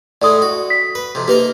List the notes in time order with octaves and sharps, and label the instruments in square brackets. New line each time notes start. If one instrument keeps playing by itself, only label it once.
[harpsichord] A2 G#3 A3 [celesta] D5 D#6
[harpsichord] F#4
[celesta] B6
[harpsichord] B4
F2 C3
[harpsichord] A#3 D#4 A#4 [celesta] G4 B4